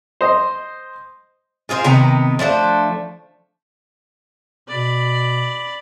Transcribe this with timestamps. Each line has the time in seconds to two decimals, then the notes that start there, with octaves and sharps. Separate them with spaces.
0.21 C5 D#5
1.69 F4 G#4 A#4 C5
1.84 C3 D#3 B3 A#5
2.39 F3 A3 D4 C5
4.69 B2 D5 B5